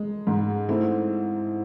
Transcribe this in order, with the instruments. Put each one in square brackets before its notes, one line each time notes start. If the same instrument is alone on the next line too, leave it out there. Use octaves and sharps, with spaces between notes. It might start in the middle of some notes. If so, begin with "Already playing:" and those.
Already playing: [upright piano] G#3
G#2
[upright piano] A3 [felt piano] C4 E4